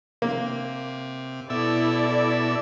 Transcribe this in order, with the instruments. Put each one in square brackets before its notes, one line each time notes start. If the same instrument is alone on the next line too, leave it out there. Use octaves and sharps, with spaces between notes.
[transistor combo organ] C3 [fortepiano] A#3
[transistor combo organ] B2 E5 [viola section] E4 A4 D5